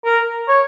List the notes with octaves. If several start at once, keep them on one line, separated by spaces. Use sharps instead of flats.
A#4
C#5